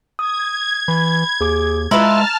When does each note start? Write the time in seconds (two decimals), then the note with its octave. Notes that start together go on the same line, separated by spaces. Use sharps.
0.19 D#6 G#6
0.88 E3 B5
1.41 D#2 G#4 D6
1.91 G#3 E4 F4 B4 A5 A#5 F6